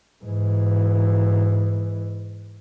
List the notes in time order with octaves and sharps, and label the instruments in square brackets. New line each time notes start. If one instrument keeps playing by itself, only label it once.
[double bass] G#2 E3